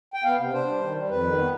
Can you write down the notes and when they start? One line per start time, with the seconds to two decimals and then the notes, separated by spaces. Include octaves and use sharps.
0.14 G5
0.24 B3 F5
0.38 C3
0.53 D4 C5
0.67 G3
0.81 D#3
0.95 G3
1.09 F2 B4
1.24 D#3
1.37 B3